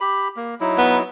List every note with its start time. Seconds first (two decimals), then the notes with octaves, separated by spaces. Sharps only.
0.01 G4 B5
0.36 A#3
0.61 F#3 D#4 E4
0.78 B3